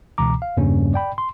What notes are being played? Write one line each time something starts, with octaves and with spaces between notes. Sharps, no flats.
C#2 B2 E3 A#5 D6
F5
E2 G2 C#3 G3 A#3 C#4
D5 G5 B5
C6